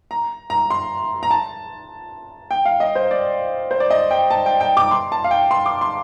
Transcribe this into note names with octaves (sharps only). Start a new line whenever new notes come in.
A#5
A#5
C6
A#5
A5
G5
F5
D#5
C5
D5
C5
D5
D#5
G5
A5
G5
G5
D6
C6
A5
F5
G5
C6
D6
C6